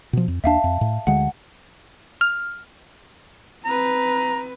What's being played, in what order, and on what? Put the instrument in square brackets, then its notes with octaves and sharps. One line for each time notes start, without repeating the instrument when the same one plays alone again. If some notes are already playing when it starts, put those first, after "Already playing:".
[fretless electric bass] B2 F3
F2
[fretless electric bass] D#2 D4 [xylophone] E5 F5 A5
[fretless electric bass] F2
A2
[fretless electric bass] D2 D3 G#3 [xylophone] F#5
[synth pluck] F6
[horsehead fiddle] C4 B4 [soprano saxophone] A#5